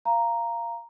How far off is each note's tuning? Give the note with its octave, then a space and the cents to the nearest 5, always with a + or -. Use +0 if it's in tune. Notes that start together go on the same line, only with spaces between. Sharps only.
F5 -15 A#5 +0